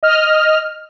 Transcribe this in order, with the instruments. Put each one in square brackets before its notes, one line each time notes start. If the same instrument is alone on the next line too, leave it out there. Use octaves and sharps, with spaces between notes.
[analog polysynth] D#5 F6